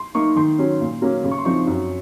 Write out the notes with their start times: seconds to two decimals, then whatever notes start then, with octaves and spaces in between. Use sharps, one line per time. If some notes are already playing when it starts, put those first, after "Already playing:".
Already playing: C6
0.15 A#3 D#4 C#6
0.36 D#3 C6
0.58 F#3 C#4
0.81 A#2
1.02 F#3 A#3 C#4
1.23 C#3
1.31 C#6
1.38 C6
1.45 F3 C4 D#4 C#6
1.67 F#2